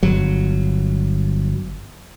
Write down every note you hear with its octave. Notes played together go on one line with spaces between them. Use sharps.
G1 F#3